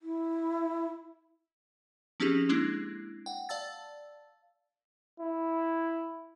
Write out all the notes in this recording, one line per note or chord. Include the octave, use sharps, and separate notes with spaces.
E4
F3 C4 C#4 D#4 G4 G#4
G#3 A#3 C4 D4 E4
F#5 G5
D5 F5 A5 E6 A6
E4